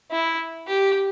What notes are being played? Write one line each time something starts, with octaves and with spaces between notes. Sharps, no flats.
E4
G4